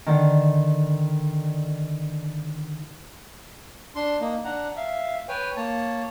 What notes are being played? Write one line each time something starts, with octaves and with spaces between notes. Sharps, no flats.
D3 D#3
D4 C6
A#3 D#4
D4 F#5 A#5
E5 F5
B4 C#5 G5 G#5
A#3 C#5 A5